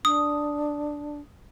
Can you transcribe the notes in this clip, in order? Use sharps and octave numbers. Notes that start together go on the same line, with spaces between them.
D4 D#6